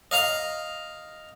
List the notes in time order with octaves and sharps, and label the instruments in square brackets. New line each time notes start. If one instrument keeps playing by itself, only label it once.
[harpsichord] D#5 F5 A#5 D#6